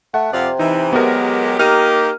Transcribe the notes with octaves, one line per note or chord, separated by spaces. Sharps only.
A3 F#5
F2 C3 F4 D5
E3 D#4
F#3 G#3 B3 G4 A#4
A#3 D#4 G4 F6 D#7